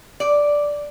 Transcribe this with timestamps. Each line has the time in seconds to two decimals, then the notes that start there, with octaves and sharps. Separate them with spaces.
0.20 D5